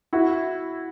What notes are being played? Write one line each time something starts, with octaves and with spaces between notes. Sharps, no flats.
E4 F#4